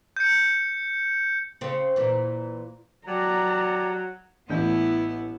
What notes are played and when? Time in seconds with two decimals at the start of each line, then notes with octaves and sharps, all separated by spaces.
0.17 G6 C#7
1.61 C#3 C4
1.96 A#2 E3
3.07 F#3 G4 D5 A5 A#5
4.50 A1 B3 E4 G6